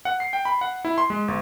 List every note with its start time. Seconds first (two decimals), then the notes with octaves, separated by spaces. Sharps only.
0.05 F#5
0.20 C7
0.33 G5
0.45 B5
0.61 F#5
0.85 E4
0.98 C6
1.10 G#3
1.28 G1